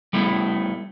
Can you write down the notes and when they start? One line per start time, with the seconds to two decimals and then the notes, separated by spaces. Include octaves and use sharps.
0.13 G3 A3 B3 E4